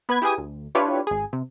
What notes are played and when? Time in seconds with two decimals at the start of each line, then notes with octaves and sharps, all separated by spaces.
0.09 B3 B4 B5 G#6
0.22 E4 G4 G#4 B4 G#5 D#6
0.38 D2
0.75 D4 E4 F4 G4 B4 C#5
1.07 G#1 G#4
1.33 C3